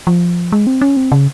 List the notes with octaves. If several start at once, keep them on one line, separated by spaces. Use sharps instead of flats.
F3
G#3
C4
C#4
C4
C#3